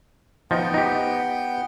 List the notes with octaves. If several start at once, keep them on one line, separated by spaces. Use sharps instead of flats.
F3 B3 D#4 G5
D#4 G4